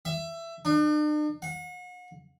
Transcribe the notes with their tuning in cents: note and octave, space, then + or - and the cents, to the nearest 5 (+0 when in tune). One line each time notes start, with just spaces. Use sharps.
E5 +20
D4 +45
F#5 -40